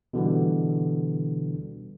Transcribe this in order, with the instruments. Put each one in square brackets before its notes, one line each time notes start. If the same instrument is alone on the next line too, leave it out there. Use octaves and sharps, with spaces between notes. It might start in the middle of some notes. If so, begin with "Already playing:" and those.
[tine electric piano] B2 D3 E3 G3